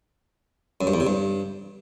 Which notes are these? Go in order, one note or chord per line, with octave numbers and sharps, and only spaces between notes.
F#2
G2
E2
C3
G2